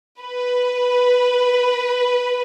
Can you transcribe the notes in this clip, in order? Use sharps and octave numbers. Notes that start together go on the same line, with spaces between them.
B4